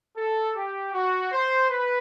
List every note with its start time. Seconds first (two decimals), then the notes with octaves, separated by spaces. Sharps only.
0.16 A4
0.55 G4
0.94 F#4
1.32 C5
1.70 B4